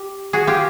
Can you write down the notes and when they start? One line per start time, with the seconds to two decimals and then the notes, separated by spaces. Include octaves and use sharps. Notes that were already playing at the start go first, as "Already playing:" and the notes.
Already playing: G4
0.33 F#4 G#4
0.47 F4 G4